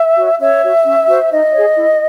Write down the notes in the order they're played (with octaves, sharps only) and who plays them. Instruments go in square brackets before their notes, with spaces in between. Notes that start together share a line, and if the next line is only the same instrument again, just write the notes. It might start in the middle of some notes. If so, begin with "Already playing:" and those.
Already playing: [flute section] E5
F#4 C#5
C#4 C#5 E5
F#4 C#5
C#4
F#4 C5
D#4 D#5
G#4 C#5
E4